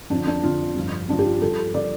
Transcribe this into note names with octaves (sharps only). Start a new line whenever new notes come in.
F2 D3 F3 D4
D4
F2 D3 F3 F4
G2 F3
G2 F3 D4
G4
F4
G2 F3 A4
F3 D5